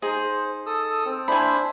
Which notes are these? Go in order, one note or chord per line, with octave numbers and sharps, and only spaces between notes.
D#4 G#4 C5
A4 D#6 E6
C4
D4 E4 C5 G#5 B5